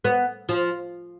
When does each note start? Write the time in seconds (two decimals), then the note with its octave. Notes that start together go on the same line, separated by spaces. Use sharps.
0.05 B3
0.49 F3